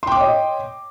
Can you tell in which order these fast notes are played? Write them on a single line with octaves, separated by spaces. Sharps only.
C6 G5 D6 C#5 D#5